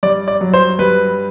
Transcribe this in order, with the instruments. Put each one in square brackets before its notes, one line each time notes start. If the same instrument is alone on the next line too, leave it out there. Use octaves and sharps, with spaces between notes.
[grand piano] G2 D5
D5
F#3
C5
G2 B4